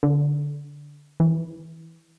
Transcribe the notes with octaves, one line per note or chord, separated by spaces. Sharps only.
D3
E3